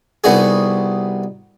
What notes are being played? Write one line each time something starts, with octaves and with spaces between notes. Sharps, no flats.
C2 B2 D#4 F#4 G#4